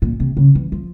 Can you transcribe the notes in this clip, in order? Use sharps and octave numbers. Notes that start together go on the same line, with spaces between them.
A#2
C3
C#3
E3
F3